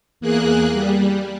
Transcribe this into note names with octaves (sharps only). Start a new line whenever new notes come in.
E2 A#3 G#4 F#6
G3